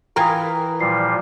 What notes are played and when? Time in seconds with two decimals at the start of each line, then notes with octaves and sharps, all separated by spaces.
0.16 E3 F4 A#4 G5 G#5 A#5 D#6
0.80 A#2 F3 G3 C7